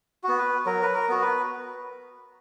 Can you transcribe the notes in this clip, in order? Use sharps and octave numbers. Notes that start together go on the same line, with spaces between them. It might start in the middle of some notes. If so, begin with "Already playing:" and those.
B3 F#4
B4
F#3 A#4
B4
A#4
B3 F#4
B4